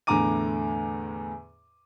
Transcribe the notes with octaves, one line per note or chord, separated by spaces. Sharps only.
E2 A2 D3 A#5 D6 D#7